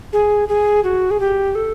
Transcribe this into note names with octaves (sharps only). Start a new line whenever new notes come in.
G#4
G#4
F#4
G#4
G4
A4